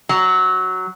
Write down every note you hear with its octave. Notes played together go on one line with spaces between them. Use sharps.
F#3